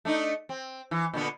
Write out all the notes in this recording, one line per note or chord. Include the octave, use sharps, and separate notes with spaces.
A3 D4 D#4
C4
E3
A#2 D3 B3